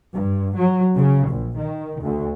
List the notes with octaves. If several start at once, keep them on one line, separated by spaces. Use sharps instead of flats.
G2
F#3
C#3
A#1
D#3
D2